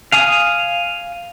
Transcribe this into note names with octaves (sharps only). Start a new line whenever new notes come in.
F5 G#5 D#6